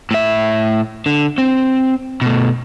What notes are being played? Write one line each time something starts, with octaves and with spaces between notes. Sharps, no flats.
A2 E5
D3
C4
B2 A3